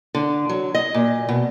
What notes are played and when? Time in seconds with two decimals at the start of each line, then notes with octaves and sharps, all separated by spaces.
0.15 D3
0.49 F#3
0.75 D#5
0.94 A#2
1.29 B2